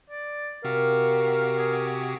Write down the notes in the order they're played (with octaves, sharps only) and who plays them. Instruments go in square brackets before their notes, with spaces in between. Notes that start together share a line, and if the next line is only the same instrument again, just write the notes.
[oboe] D5
[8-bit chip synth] C3 F#4 G4 [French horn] A#4 [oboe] F5
[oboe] G#4